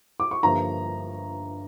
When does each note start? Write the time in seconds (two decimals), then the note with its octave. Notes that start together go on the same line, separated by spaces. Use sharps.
0.20 D6
0.31 C#6
0.43 G1 G2 F3 A#3 A#5